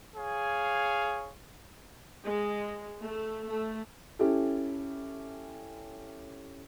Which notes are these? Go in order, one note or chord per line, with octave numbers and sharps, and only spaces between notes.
G#4 C#5 F5
G#3
A3
A3
C#4 E4 G4 A4